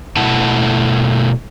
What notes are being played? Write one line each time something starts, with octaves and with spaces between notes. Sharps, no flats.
B2 A3 E4 F#5 A5